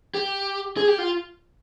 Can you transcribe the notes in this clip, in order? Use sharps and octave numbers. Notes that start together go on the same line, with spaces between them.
G4
G#4
G4
F4